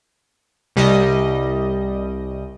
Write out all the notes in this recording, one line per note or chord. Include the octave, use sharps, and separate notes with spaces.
C2 G3 D#5